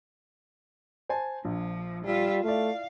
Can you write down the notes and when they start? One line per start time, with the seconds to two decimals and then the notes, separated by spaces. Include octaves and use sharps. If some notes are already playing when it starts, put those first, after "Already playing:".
1.09 C5 G#5 A5
1.45 A#1 F3
2.04 G3 F4 E5
2.44 A3 E4 D5 F5